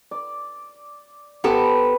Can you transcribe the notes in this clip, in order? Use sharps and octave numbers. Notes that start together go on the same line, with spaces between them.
D5
B3 G4 A4 B4 C5